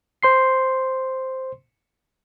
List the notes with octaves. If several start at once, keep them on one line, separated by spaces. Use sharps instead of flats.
C5 C6 C7